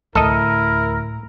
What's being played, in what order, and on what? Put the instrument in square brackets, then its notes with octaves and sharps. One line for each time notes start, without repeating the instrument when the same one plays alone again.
[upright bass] D2 [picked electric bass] A2 [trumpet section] E4 A#4 [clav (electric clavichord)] A4 D#5